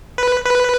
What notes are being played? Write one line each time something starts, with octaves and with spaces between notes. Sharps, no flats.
B4
B4